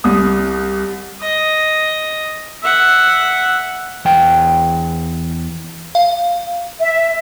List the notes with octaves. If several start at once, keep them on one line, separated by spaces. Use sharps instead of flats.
C2 D#6
D#5
E5 F#5
E2 G5
F5
E5